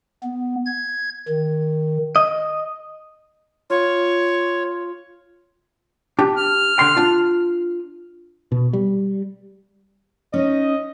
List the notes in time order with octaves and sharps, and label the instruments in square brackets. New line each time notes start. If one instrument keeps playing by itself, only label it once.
[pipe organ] B3
G#6
D#3
[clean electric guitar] D#5
[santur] F4 [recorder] C#5
[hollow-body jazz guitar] D4 G4
[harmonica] F6
[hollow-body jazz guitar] D3 C6
D4 F4
[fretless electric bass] B2
G3
[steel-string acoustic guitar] C#4 D#4 C#5 [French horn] D#5